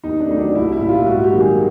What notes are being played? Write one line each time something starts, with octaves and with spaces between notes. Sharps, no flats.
D#2 D#4
D4
D#3 F#3 A3 D#4
D4
C2 E4
E4
A#2 G3
F4
G#2 F#4
G4
D#3 F#3 A#3
G#4